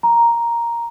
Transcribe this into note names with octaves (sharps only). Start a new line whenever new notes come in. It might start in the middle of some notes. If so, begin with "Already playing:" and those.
A#5